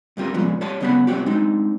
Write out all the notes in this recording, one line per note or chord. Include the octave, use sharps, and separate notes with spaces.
G2 C3 G3 F4 A#4
A#2 C#3 F3 G#3 B3
G3 C#5 A5 C6
F#2 C#3 B3 F#5 B5
B2 F#3 G#3 C4 F#4 G4
G#3 C4 D4 D#4